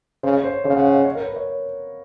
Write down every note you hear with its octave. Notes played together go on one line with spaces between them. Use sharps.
C#3 C5
C#5
C5
C#3 C#5
F5
F#5
F#5
D#5
C#5
A#4
B4
C#5